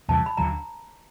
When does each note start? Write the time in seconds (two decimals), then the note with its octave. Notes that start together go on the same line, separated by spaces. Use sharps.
0.08 E2 C3 E3 G3 A5
0.26 B5
0.37 D2 D3 F#3 A#5